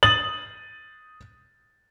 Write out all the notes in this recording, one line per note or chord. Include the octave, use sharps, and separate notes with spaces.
D#6 A6 F#7